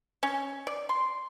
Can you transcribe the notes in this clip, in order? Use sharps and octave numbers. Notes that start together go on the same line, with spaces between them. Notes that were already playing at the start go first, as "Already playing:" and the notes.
C#4
D5
C6